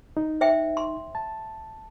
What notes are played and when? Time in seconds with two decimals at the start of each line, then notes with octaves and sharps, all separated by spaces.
0.17 D#4
0.41 C5 E5 G5
0.77 C6
1.15 A5